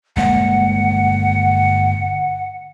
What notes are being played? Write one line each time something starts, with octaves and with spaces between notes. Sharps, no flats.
G1 G#3 A#3 F#5